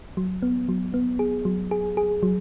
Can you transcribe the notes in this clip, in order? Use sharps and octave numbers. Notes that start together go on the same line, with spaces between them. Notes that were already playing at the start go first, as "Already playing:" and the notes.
F#3
B3
F#3
B3
G#4
F#3
G#4
G#4
F#3